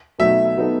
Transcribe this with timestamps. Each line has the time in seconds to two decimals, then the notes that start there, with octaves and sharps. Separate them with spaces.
0.19 B2 F#3 A3 D#4 E5
0.58 F#3 B3 D#4 A4